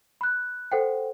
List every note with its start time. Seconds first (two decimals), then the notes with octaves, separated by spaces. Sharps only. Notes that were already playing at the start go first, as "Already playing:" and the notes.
0.21 B5 F#6
0.72 A4 C5 F#5 G5